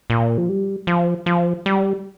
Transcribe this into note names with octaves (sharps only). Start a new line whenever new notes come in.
A#2
F3
G3
F3
F3
G3